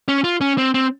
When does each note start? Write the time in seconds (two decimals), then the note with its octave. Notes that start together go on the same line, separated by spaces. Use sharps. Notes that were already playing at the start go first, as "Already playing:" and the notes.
0.08 C#4
0.24 F4
0.41 C#4
0.58 C4
0.74 C4